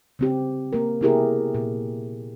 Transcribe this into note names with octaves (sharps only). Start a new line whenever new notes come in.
C#3 C4 G4
A#3 A#4
C3 B3 E4 G4 G#4 A#4
A#2